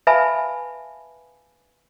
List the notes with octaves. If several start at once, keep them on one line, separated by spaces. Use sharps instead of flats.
B4 E5 F5 G#5 A5 B5